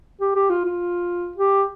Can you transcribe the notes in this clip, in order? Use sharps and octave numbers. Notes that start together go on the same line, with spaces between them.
G4
G4
F4
F4
G4